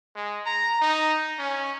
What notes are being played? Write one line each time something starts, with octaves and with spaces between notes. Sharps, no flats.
G#3
A#5
D#4
C#4